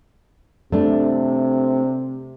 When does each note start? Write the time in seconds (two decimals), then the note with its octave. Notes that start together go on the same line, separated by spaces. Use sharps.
0.72 C3 A3 D4